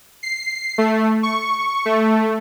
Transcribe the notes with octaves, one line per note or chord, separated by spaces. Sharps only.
C7
A3
C#6
A3